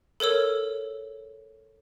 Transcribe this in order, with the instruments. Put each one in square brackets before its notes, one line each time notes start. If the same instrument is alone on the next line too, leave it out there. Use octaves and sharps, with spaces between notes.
[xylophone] A4 A#4 C#5 E6